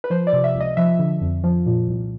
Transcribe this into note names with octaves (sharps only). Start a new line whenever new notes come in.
B4
F3 C5
D5
C3
E5
C#2
D#5
F3 E5
D3
F2
F3
A#2
C2